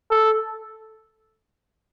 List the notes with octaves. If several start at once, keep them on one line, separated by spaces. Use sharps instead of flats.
A4